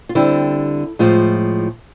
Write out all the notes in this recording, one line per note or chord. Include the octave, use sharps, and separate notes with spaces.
F4
D3 G3 C4 E4
A2 F3 G#3 F4